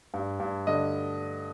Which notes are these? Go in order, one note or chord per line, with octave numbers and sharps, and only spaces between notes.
G2
G2
D3 D#5